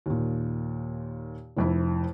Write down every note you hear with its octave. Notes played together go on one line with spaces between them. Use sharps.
D#2 A#2
F1 F2 E4